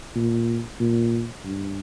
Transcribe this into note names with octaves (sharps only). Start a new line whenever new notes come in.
A#2
A#2
G2